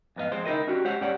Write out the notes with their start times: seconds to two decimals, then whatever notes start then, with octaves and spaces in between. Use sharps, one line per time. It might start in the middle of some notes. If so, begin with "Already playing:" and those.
0.16 F2 G#2 B3 E4 D#5 F5
0.32 F3 G#3 C4 C5
0.45 C#2 D#4 E4 A#4 D#5
0.67 C#4 D4 F#4 G4
0.85 G#3 G4 C5 C#5 F#5
1.01 G2 C#4 G4 C#5 D5 F#5